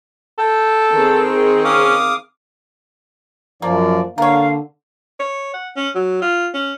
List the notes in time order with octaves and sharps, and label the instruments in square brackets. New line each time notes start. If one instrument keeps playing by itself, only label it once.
[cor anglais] A4 [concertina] G5
[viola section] D#3 C4 G#4
[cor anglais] C#4 [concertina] F5 D6 D#6
[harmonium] F#2 D5 [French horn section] F3 [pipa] A#3
[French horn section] D3 [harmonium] A#3 [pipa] A#4 C#5 [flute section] F5
[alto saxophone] C#5
F#5
C#4
F#3
F4
C#4